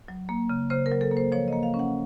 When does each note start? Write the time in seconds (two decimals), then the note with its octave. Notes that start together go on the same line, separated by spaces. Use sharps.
0.08 F#3
0.29 A#3
0.50 C#3
0.70 C#3 C5
0.86 A#4
0.91 F#3
1.01 A4
1.11 A#3
1.17 C5
1.32 F3 C#5
1.48 D#5
1.53 A#3
1.63 F5
1.74 C#4
1.79 F#5